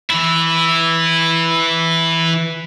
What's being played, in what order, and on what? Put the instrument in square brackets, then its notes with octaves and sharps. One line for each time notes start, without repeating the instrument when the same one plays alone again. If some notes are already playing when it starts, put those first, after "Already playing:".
[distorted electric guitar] E3 E4